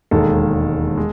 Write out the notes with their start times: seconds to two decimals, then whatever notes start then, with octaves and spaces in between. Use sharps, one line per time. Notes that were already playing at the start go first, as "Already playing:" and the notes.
0.11 E1 D#2 D#3 G#3 A4
0.97 G#3